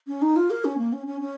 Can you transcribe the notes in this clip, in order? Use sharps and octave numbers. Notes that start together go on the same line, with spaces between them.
C#4
D#4
F4
A#4
C#4
A#3
C#4
C#4
C#4